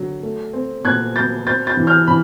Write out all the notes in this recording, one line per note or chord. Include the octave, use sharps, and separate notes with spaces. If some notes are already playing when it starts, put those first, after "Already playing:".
Already playing: D3 F#3
A3
C4
A#2 F#6 G#6
F#3 G6 A6
C4 G6 A6
G6 A6
E3
F6 G6
E3 B5